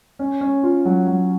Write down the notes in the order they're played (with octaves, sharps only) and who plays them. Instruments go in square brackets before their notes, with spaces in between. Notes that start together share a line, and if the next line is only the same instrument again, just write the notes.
[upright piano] C#4
C#4
F4
F#3
F#3